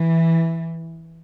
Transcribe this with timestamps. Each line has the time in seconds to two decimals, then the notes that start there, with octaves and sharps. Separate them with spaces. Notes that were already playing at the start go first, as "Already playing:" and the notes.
Already playing: E3